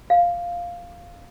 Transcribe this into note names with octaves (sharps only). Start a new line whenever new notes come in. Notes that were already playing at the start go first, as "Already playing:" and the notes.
F5